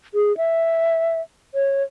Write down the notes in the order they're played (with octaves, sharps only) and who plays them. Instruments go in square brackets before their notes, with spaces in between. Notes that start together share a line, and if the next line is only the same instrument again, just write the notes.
[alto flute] G#4
E5
C#5